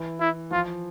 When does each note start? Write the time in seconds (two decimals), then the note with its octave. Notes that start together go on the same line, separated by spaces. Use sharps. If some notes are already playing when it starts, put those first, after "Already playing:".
Already playing: E3
0.20 E4
0.51 F3 F4